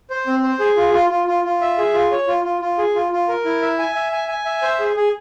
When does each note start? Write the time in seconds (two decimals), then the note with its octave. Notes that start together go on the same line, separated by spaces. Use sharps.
0.10 C5
0.27 C4
0.43 C5
0.60 G#4
0.77 F4
0.94 F4
1.10 F4
1.27 F4
1.45 F4
1.61 E5
1.78 G#4
1.94 F4
2.11 C#5
2.28 F4
2.45 F4
2.62 F4
2.78 G#4
2.95 F4
3.12 F4
3.28 A#4
3.45 E4
3.62 E5
3.79 G#5
3.95 E5
4.12 G#5
4.28 G#5
4.45 E5
4.62 C5
4.80 G#4
4.96 G#4